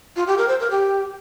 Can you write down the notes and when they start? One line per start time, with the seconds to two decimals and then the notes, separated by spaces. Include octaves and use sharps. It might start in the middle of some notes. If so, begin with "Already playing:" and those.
0.16 F4
0.27 G4
0.38 A#4
0.48 C5
0.60 A#4
0.71 G4